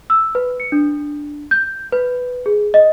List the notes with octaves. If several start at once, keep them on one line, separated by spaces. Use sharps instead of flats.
E6
B4
C#7
D4
G6
B4
G#4
D#5